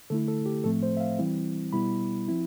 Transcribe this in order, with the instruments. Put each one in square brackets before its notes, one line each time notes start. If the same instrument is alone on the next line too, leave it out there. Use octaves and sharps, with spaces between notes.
[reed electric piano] D3 A3 E4 A4
A4
G4
A2 F3 A3 C4 A4
C5
E5
F5
E3 G3 C4 E4
B2 G3 B3 E4 B5
F3 C4 E4